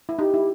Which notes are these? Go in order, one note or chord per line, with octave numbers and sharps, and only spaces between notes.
E4
D#4 G4
E4